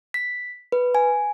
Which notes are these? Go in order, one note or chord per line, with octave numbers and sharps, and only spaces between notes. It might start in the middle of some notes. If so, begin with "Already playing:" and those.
B6
B4
G#5